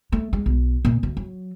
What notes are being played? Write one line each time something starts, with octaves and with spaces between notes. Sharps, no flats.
A3
G#3
B1
A#2
D2
F#3